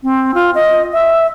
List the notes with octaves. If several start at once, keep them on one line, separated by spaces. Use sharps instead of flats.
C4
F4
D#5
E5